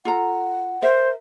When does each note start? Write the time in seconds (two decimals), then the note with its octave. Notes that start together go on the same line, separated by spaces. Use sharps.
0.05 F4 A4 F#5 A#5
0.82 A#4 C5 E5